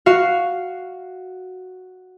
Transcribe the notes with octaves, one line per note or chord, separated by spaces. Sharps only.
F#4 F5